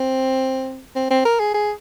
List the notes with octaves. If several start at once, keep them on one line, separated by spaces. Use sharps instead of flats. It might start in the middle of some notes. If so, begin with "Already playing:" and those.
Already playing: C4
C4
C4
A#4
G#4
G#4